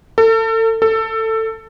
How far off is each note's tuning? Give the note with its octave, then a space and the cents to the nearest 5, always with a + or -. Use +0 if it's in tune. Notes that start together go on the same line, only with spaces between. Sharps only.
A4 +35
A4 +15